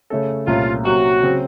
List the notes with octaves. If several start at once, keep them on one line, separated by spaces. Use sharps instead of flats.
C#3 A3 C#4 A4
C2 A#2 A3 C#4 F4
C3 F#3 A#3 C#4 F#4
C#3 F#3 C4